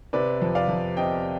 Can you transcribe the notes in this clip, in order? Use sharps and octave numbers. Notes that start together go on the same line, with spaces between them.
C3 B4 D5
F2
D5 F5
F2
C3 D#5 G5